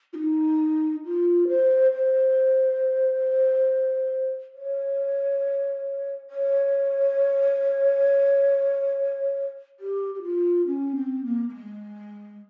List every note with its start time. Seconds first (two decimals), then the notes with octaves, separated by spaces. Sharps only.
0.13 F4
0.17 D#4
1.05 F4
1.48 C5
1.93 C5
4.54 C#5
6.30 C#5
9.80 G4
10.14 G4
10.22 F4
10.67 C#4
10.95 C4
11.25 A#3
11.49 A#3
11.55 G#3